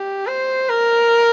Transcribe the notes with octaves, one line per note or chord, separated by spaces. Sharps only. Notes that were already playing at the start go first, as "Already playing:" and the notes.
Already playing: G4
C5
A#4